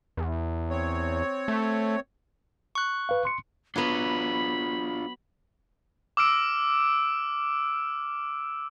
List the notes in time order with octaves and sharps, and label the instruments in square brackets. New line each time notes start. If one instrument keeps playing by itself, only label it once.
[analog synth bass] E2
[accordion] C4 C#5
[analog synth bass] A3
[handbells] C#6 F#6
[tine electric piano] B4 F5
C6 C#7
[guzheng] F#3 B3 [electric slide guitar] D4 F4 [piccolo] B5
[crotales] D6 E6 F6 D7